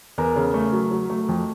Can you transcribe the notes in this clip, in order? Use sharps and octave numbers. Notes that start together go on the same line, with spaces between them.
E2 A#4
C#3
A3
F#3
F#3
A3
F2